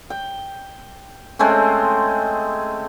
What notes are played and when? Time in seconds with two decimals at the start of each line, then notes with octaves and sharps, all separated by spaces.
0.10 G5
1.39 G#3 A3 C4 C#4